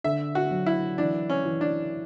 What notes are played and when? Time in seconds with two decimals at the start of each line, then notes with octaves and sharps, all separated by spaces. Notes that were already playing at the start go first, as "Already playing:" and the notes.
0.04 D3 E5
0.35 F#4
0.51 F#3
0.66 E4
0.98 E3 D4
1.30 C#4
1.45 E3
1.61 D4